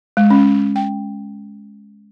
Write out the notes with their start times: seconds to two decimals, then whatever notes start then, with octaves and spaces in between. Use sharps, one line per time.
0.17 G#3
0.30 C#4
0.76 G5